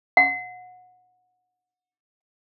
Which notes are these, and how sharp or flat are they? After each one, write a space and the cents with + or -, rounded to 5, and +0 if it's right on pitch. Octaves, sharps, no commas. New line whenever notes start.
F#5 -25